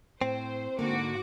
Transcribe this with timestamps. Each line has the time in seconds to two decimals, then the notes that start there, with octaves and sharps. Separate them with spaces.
0.21 A2 C4 C5
0.79 G#2 D3 A#3 F#4 D6